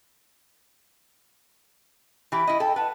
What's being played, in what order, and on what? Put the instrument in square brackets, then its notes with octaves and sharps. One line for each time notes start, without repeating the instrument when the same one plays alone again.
[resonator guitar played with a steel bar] E3 G4 [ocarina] B5
[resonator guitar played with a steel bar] E4 D#5
[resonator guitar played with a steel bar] A4 [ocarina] G5
[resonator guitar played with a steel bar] B4 F#5 [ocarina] A5